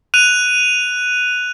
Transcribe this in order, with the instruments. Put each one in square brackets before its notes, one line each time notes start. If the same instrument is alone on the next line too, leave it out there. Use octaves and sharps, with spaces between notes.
[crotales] F#6 D#7 F7